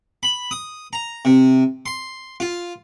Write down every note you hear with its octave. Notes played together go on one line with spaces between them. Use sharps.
B5
D#6
A#5
C3
C6
F4